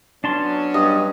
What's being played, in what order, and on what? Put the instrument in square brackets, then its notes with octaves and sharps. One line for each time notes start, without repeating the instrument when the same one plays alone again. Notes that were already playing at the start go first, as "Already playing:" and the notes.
[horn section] F#3 B3 C#4 [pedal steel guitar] D4 A5 C6
[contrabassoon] G2 [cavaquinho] D#5